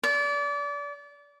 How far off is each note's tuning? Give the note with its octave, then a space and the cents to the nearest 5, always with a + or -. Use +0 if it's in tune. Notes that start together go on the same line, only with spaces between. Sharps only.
D5 -30